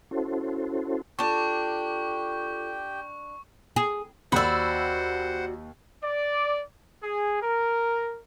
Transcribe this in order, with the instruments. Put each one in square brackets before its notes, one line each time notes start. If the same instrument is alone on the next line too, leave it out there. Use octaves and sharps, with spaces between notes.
[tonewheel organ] C#4 E4 F#4 A4 C5
[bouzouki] D4 A5 [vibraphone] F4 A4 [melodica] G4 G5 [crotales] C#6
[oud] G#4
[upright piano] D#2 [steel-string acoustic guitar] F#4 D5 [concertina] C5 F#5 [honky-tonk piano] B5 E6
[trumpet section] D5
G#4
A#4